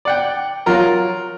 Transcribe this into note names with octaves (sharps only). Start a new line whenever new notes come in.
D5 F#5 G5
F#3 F4 A#4